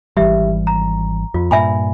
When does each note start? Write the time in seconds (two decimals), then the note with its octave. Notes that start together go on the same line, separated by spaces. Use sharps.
0.17 G#1 E3 G3 G4 E5
0.67 A#5
1.34 F2 F4
1.51 G2 A#2 E5 G#5 B5